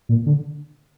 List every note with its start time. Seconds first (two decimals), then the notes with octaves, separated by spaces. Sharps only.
0.09 A#2
0.26 D3